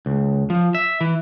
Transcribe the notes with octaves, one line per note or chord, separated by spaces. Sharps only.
C#2
F3
E5
E3